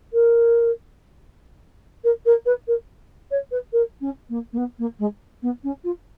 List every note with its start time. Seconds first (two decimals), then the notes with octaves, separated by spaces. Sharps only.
0.13 A#4
2.04 A#4
2.25 A#4
2.45 B4
2.67 A#4
3.31 C#5
3.51 B4
3.72 A#4
4.01 C#4
4.29 A#3
4.52 A#3
4.57 B3
4.78 A#3
4.99 G#3
5.42 B3
5.63 C#4
5.84 F4